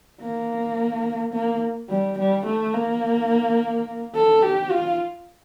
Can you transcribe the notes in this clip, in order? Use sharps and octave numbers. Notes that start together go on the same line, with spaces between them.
A#3
A#3
G3
G3
A3
A#3
A4
G4
F4